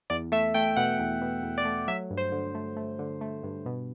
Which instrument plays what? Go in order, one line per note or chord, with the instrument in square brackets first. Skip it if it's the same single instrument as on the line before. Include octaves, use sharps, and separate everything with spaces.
[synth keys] E2 D5
A3 E5
A3 G5
B2 F#5
E2
B2
E2
D5
A3
F#3 E5
G2
C5
D3
A3
A3
D3
A3
G2
B2